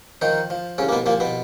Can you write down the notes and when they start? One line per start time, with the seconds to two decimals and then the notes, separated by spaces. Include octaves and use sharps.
0.21 D#3 F3 D#4
0.50 F3
0.78 C2 C#3 C#4
0.88 A#3
0.92 B2 B3
1.06 A#2 F3 A#3
1.20 B2 B3